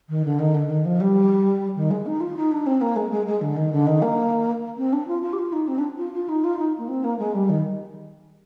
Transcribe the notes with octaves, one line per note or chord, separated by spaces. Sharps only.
D#3
D3
D#3
D3
D#3
F3
G3
D#3
G#3
D#4
F4
D#4
D4
C4
A#3
G#3
G#3
G#3
D3
D#3
D3
D#3
A#3
C4
D4
F4
F4
G4
F4
D#4
C4
D4
F4
F4
D#4
F4
D#4
A#3
C4
A#3
G#3
G3
D#3